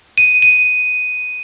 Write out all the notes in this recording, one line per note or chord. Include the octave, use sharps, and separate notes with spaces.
D#7
D#7